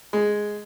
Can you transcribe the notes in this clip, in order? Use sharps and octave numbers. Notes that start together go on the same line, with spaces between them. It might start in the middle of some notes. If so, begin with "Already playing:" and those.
G#3